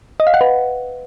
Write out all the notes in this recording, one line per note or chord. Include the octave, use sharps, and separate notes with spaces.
D#5
F5
F#5
B4